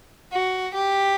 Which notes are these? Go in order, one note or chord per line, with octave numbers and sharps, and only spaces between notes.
F#4
G4